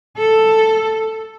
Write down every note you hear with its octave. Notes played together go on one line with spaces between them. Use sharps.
A4